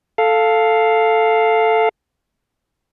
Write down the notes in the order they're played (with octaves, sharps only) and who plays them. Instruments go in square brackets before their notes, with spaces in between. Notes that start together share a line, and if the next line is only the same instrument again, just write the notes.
[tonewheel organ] A4 F5